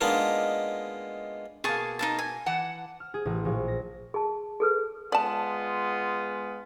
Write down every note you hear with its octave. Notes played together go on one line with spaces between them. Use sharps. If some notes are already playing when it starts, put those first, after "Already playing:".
G#3 A#3 B3 D4 D#4 F4
B2 A#3 G#4 A5 C#6
D#4 F5 A5
G#5
E3 F#5 A5
F6
G#4
A1
A#1
A#6
G#4 A5
G#4 A4 B4
G#3 B3 F4 D5 A5